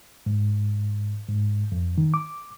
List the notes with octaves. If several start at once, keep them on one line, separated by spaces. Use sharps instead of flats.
G#2
G#2
F2
D#3
D6